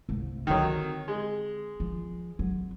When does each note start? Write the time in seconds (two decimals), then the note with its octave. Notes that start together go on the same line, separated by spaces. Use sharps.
0.09 C2 A3
0.47 D3 D#3 F#3 C4
1.08 G#3
1.80 F3
2.39 F#3